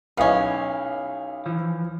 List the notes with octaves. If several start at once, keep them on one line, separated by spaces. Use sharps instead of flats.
B1 B3 C#4 E4 D#5 F5
E3 F3